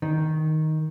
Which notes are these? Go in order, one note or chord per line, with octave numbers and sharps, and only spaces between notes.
D#3